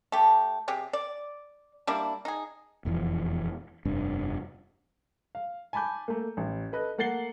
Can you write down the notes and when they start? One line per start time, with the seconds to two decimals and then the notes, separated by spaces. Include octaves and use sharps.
0.12 A3 G4
0.68 C3 G4 G#4
0.93 D5
1.87 G3 A#3 D4 E4
2.25 D#4 G#4
2.85 E1 F2 E3
3.85 F1 G2 D4
5.35 F5
5.73 G#5 A5 B5 D6 G6
6.08 A3 A#3
6.37 A1
6.72 A4 B4 D#5
6.98 A3 A#3 F#5 A6 C7 G7